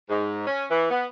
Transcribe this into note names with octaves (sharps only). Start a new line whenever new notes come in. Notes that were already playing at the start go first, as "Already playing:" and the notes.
G#2
C#4
E3
B3